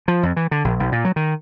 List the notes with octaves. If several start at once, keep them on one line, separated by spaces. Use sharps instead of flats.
F3
F2
E3
D3
A#1
B1
A#2
F#3
D#3